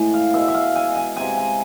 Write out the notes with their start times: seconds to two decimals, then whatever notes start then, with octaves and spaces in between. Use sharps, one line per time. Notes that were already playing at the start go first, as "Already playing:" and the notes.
Already playing: A2 G#3 G#5
0.14 F5
0.33 B2 G#3 E5
0.48 E5
0.54 F5
0.76 G#5
0.96 G#5
1.16 C3 G#3 G#5
1.37 G#5